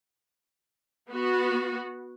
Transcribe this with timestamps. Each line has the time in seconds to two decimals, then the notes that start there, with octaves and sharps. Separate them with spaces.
1.10 B3 F#4